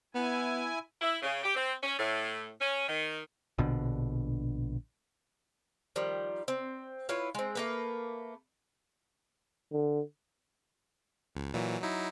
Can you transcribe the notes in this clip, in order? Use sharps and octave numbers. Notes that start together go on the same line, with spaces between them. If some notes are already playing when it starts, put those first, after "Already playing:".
B3 E4 G#5
E4
C#3
G4
C4
C#4
A2
C#4
D#3
A#1 B2 D3
D#3 F3 G3
C4
E4 F4 B4 C#5
G#3 C4
A3 A#3 B4
D3
C#2
A#2 E3 F#3
F#3 D#4 E4